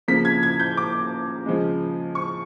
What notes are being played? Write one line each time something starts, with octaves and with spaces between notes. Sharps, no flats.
C#3 F3 A#3 B6
G#6
G#6
G6
D6
C#3 F3 G#3
C#6